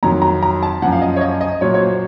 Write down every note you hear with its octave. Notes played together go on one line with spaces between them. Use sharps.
F2 D#3 F#3 A#5
A#5
A#5
A5
F#2 F3 F#5
F5
D#5
C#5
D#5
D#5
A#2 F#3 C#5
C#5
C5